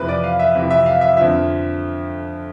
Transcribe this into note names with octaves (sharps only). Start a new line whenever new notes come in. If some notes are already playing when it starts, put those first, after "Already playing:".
Already playing: F2 C3 E3 B4
D5
F5
E5
F2 C3 E3
E5
F5
E5
F2 D3 F3 E5